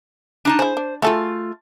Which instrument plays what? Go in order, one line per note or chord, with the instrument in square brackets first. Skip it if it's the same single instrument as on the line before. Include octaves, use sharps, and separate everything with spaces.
[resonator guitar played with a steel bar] D4 D#4 A5
[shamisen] E4 G#4 [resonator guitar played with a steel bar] C5
[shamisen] D4
[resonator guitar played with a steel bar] A3 F4 [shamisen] F#4 G#4 A4